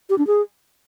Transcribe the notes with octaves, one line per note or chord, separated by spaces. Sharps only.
G4
D4
G#4